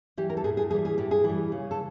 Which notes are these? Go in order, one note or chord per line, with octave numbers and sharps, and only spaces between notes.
E3 G3 G4
A#4
A4
A2 G#4
G#4
E3 G3 G#4
G#4
A2 G4
G#4
E3
G3
C#3
A4